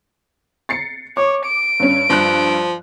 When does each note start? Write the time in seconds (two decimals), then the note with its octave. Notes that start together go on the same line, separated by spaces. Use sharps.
0.69 A6 C7 C#7
1.17 C#5 D6
1.46 D7
1.80 G2 C#4
2.10 G2 F3 F#6